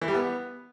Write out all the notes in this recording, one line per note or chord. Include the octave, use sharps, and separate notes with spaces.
E3
G3
B3